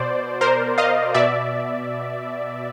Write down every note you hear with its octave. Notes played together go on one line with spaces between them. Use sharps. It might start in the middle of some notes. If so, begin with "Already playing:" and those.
Already playing: B2 C5 D5
A#4 C5
D#5 F5
B2 D5 E5